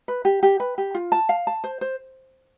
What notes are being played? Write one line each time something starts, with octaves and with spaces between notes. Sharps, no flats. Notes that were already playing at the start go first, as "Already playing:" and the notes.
B4
G4
G4
B4
G4
F4
A5
F5
A5
C5
C5